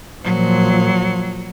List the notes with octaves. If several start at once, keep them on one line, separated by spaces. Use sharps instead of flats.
A#2 F3 F#3